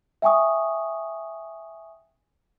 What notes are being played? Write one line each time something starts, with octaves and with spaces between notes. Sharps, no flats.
E5 G5 G#5 C#6 D#6